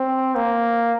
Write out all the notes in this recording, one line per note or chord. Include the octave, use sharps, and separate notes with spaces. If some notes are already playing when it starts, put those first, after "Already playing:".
Already playing: C4
A#3